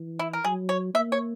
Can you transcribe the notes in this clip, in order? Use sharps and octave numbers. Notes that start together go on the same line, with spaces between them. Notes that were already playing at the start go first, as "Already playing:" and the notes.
Already playing: E3
E4
A#4
F#3 G#4
C#5
A#3 E5
C#5